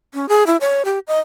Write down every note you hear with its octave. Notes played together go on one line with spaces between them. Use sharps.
C#4
G#4
E4
C#5
G4
D#5